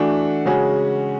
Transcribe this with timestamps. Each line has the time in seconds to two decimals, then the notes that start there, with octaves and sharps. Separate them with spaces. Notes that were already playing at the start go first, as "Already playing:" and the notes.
Already playing: E3 A3 D4 F#4
0.46 C#3 G#3 C#4 F#4